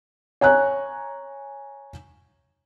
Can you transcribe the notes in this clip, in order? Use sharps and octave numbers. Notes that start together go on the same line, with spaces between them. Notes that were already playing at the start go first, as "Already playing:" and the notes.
C#5 G#5 A#5 F#6